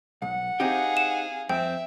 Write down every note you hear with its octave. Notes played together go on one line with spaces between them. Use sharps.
B1 F#5
C4 D#4 G4 G#4 F5
E7
F2 C4 E5 G5